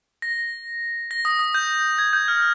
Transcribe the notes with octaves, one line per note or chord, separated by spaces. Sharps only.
A#6
A#6
D#6
D#6
G6
G#6
G6
F6